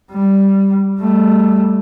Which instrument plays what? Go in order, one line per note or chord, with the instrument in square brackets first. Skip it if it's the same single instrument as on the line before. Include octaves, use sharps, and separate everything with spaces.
[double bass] G3
G3 A3